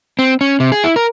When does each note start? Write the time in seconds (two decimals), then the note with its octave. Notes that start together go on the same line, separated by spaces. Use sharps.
0.19 C4
0.41 C#4
0.60 C3
0.72 G#4
0.84 E4
0.96 A#4